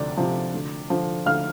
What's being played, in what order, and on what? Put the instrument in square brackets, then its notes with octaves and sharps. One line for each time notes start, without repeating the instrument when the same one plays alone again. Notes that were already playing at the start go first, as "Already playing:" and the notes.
Already playing: [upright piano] D2 C3 F3 D5
C3 F3
D2
D3 F3
D2 F5 F6